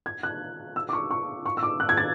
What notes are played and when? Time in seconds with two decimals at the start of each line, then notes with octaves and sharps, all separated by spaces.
0.06 G#6
0.23 F#6
0.76 E6
0.89 D6
0.93 C#6
1.11 C#6
1.46 C#6
1.57 E6
1.63 D6
1.80 F#6
1.89 G#6
1.97 A6